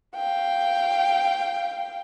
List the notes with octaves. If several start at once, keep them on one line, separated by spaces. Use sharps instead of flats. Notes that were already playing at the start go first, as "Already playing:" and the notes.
F5 G5